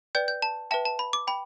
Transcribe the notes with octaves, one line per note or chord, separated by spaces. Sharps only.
B4 D5 G5 G6
G6
A5
B4 E5 G5 A5
A5
B5
D6
G5 B5